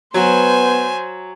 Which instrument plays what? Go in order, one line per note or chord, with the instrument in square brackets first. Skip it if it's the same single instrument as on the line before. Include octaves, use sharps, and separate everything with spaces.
[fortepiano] F#3 [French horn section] B3 [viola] C5 [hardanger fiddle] G#5